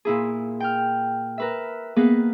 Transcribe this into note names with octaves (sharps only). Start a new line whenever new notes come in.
A#2 E4 G#4
G5 F6
A#4 B4 E5
A#3 B3 G#4 A#4 B4